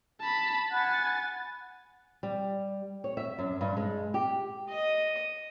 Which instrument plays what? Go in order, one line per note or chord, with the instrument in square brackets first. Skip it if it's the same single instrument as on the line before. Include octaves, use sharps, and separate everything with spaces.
[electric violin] A5 B5
[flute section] F#5 B5 F#6 [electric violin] G#5 A6
[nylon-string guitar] G3
C#5
E5
F#2
G2
G#3
G4
[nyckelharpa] D#5